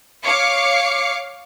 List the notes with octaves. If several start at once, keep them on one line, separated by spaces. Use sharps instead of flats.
C#5 F5 D6 C#7